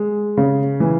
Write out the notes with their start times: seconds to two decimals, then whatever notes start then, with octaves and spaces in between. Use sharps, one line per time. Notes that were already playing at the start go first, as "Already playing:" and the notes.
Already playing: G#3
0.37 C#3
0.80 E3